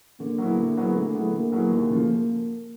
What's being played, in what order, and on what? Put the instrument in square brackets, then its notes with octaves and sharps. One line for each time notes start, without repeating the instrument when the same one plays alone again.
[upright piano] D3 [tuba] A#3
[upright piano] F#3 B3 E4 G#4
D3
F#3 B3 E4 G#4
[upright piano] D3 [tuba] A3
[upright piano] F#3 B3 E4 G#4
[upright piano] D3 [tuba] A#3
[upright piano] F#3 B3 E4 G#4
D#2
C#3 F3 A3